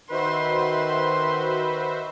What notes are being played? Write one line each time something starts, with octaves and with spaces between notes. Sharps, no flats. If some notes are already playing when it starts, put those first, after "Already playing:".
D#3 F#4 B4 C5 E5 C6